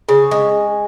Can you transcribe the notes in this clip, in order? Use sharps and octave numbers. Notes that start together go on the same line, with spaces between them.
C#3
G#3